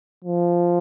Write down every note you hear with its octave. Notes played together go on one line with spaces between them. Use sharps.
F3